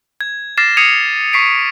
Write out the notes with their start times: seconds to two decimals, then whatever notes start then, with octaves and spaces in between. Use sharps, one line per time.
0.21 G#6
0.57 D6 F6 A6 A#6 C7 E7
0.77 D#6 G#6 C7 C#7 D#7 F7
1.33 C#6 B6 C7 D7